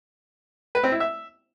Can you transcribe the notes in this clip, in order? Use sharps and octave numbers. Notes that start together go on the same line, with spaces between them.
B4
C4
E4
E5